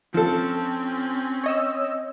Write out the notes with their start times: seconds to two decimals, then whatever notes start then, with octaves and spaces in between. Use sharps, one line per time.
0.14 F3 C4 C#4 A4
1.44 C#5 D#5 E6